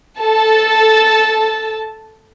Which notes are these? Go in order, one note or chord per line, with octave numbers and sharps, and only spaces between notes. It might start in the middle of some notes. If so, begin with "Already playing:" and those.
A4 A5